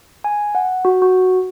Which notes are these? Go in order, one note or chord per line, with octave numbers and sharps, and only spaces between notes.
G#5
F#5
F#4
F#4